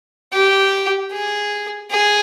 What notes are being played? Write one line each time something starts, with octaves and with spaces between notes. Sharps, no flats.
G4
G#4
G#4